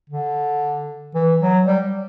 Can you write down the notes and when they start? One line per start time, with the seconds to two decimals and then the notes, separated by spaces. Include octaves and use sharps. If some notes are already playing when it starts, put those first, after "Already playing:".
0.10 D3
1.15 E3
1.41 F#3
1.66 G3